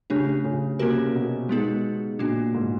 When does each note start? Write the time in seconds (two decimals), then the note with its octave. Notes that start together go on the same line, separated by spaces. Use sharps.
0.10 C#3 A3 D4 G4
0.44 C#3
0.79 C3 A#3 C#4 F#4 A#4
1.14 B2
1.49 G#3 B3 D#4 G#4
2.19 A#2 A#3 D4 F#4
2.54 G#2